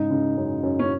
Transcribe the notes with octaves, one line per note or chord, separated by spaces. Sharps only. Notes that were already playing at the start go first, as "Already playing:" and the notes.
Already playing: G#2 C#3 D#4
C#3
F#2
F#2
C#4